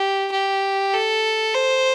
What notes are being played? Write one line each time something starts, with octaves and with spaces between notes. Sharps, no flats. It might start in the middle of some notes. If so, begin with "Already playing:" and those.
Already playing: G4
G4
A4
C5